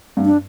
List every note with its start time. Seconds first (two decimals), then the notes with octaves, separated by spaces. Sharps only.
0.17 G2
0.25 D4